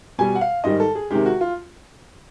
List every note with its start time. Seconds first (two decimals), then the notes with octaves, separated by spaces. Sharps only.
0.18 B2 G3 G#5
0.35 F#5
0.41 F5
0.64 G#2 D#3 G3 D#5
0.80 A4
0.95 G#4
1.10 C3 D#3 G#3 G4
1.26 F#4
1.41 F4